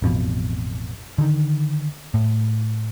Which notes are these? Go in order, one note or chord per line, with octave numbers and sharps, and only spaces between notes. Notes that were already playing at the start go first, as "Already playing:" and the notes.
A1 F2 B2
D3 D#3
A2